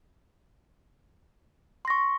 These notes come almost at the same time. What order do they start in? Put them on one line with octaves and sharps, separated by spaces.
C6 A#6 C#6